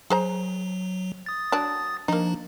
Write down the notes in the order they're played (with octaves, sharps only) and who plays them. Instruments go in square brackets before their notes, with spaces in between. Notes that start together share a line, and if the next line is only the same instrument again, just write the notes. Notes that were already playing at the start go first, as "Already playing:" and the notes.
[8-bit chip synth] F#3 [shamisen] G#4 C5 A#5
[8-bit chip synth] D#6 A6
[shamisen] F#3 D4
[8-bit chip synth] F3 D4 [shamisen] A#3 D#4